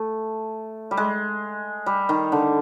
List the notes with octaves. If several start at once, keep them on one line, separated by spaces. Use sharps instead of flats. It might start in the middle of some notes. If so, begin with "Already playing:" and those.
Already playing: A3
G3
G#3
G3
D#3
D3